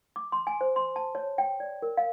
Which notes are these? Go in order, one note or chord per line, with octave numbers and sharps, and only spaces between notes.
D6
C6
G#5
C5
C6
A5
C#5
G5
D5
A#4
F5